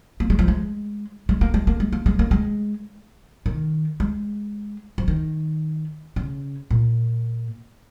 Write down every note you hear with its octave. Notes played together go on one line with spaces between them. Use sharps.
A#3
G#3
F3
G#3
G#3
A#3
G#3
A#3
G#3
A#3
G#3
A#3
G#3
D#3
G#3
F3
D#3
C#3
A#2